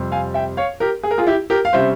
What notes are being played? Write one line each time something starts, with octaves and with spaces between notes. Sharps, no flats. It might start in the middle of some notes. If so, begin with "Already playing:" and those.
Already playing: F2 C3 G3 C4
F5 G#5
E5 G5
C#5 F5
G4 A#4
G#4
A#4
F4 G#4
E4 G4
G4 A#4
F5
C3 G3 C#4 C5 E5